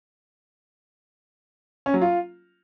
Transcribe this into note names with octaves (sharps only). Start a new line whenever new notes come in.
C#4
F#3
F4